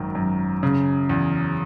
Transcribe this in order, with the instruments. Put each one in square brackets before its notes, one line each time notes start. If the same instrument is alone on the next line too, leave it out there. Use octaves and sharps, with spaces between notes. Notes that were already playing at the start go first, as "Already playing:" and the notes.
Already playing: [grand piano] G#1 F#2 D#3
F#2
C#3
E2